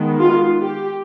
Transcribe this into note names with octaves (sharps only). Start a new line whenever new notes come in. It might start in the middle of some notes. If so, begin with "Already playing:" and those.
Already playing: D#3 G#3 B3
F4
G4